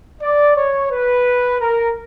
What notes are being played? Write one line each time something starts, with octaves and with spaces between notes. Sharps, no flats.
D5
C#5
B4
A#4